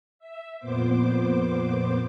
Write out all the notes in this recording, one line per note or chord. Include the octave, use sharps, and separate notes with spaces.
E5
F2 A#2 B3 C5 D6